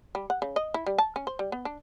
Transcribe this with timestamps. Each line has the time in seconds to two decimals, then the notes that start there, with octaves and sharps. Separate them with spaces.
0.15 G3
0.30 F#5
0.42 C#3
0.56 D#5
0.74 E4
0.86 G3
0.98 A5
1.16 C#4
1.27 C5
1.39 G3
1.52 B3
1.65 D4